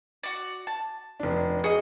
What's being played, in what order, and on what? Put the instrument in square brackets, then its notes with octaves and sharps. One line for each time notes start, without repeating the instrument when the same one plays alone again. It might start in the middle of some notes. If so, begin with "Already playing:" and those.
[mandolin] F#4 D5
A5
[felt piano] F1 D4
[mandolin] F#4 D#5 [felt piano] G#4